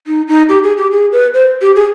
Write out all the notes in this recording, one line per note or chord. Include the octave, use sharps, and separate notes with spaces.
D#4
D#4
G4
G#4
G4
G#4
B4
C5
G4
G#4